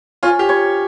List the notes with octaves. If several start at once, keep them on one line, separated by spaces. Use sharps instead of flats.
C#4 F4
G4
C#5